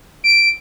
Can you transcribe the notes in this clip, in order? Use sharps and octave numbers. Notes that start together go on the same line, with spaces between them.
D7